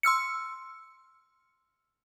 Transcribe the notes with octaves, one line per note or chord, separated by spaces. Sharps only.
C6 E6 F6 C#7